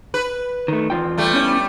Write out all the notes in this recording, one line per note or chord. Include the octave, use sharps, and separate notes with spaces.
B4
D#3 A3
E2 F4 G5
G3 A3
B3 C#4 E4